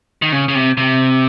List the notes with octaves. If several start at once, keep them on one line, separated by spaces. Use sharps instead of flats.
D#3
C#3
C#3
C3
C3